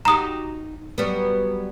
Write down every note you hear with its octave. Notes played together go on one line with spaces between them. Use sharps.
D#4 F#4 G4 A#5 D#6
F#3 G3 B3